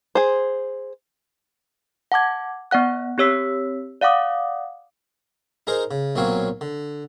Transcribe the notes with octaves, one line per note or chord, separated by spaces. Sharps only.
G#4 C5
F#5 A5 D6 G#6
B3 D5 F#5 F#6
C4 G4 C#5 E6 B6
D5 F5 F#5 D6 D#6
D#4 G#4 A#4 C5
C#3
B1 A#2 F#3 C4 C#5 F5
D3